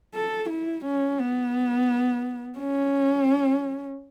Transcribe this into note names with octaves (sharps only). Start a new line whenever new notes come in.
A4
E4
C#4
B3
C#4